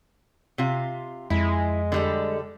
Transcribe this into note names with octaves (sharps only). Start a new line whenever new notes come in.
C3 F4
F2 G#3 E4
D3 G3 A4